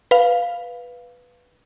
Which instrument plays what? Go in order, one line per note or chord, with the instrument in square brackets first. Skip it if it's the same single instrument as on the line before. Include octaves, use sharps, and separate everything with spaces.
[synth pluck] B4 F5